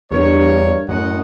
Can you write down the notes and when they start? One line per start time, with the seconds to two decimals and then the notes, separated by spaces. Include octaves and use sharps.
0.12 E2 G2 A#4 C#5
0.89 F#2 A2 D#5 F#5